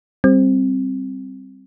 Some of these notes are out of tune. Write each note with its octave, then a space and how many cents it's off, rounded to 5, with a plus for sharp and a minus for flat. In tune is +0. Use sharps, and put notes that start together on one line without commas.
G3 +0 C4 +10